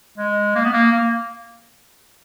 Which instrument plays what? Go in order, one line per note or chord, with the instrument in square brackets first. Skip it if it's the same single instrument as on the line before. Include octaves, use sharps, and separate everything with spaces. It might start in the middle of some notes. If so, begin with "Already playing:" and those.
[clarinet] G#3
A#3
B3
A#3
A#3